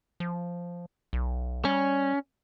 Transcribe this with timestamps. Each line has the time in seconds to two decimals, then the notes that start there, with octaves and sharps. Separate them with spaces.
0.20 F3
1.13 B1
1.65 G3 C#4